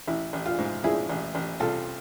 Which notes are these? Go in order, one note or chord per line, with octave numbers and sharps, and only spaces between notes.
A1 E4
A1
F4
G#2
F3 E4 G#4
A1
A1
C2 F4 A4